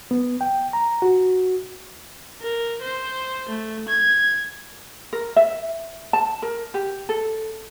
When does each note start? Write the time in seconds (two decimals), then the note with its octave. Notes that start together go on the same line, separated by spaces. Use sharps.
0.11 B3
0.41 G5
0.73 A#5
1.02 F#4
2.41 A#4
2.82 C5
3.49 A3
3.89 G#6
5.13 A#4
5.36 E5
6.13 A5
6.42 A#4
6.74 G4
7.09 A4